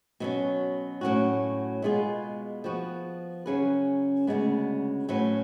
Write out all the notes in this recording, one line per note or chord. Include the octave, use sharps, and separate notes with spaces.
B2 F#3 C#4
A2 F#3 C#4 F#4
B2 G#3 B3 F4 G#4
F3 B3 F#4
C#3 F#3 C#4 G#4 B4
D2 C#3 G#3 B3
A2 F#3 C#4 F#4 B4